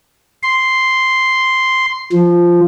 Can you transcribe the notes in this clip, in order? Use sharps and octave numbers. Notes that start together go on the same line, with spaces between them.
C6
F3